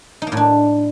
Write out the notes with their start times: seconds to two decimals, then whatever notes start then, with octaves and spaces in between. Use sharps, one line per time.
0.22 D#4
0.27 A#3
0.32 A2
0.37 D4